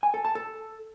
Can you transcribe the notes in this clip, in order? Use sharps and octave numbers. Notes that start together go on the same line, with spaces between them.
G#5
A4
A5
A4